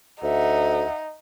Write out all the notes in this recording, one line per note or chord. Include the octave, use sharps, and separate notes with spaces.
D2 D#4 E5 F#5